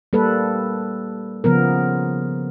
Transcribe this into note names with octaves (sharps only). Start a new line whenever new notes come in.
G3 A#3 A4 B4
C#3 F3 B3 A#4